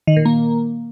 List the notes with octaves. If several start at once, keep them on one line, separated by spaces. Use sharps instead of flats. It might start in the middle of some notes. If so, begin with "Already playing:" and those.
D#3
A#2
A#3